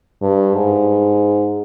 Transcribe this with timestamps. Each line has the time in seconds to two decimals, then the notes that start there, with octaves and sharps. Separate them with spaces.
0.22 G2
0.55 G#2